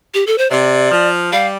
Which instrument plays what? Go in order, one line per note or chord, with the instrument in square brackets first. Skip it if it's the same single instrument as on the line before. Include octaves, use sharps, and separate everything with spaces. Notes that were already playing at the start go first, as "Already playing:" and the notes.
[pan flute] G4
A4
C5
[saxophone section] C3 [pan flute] D5
[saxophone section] F3
[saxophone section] G3 [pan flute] F5